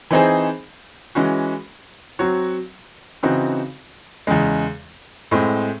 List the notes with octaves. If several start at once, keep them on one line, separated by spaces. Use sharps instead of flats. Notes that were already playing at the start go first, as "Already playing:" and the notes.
E3 C4 D#4 G#4 C5
E3 G#3 C#4 F#4
F#3 C4 F#4 C#5
C#3 E3 C4 D#4 F#4
E2 C#3 G#3
A2 G#3 C4